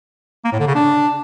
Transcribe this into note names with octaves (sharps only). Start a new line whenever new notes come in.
A#3
A2
D3
C#3
D4